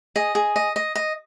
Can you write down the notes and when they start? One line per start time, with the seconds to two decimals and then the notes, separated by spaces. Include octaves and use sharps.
0.16 G#4 D#5
0.35 G#4
0.56 D#5
0.76 D#5
0.95 D#5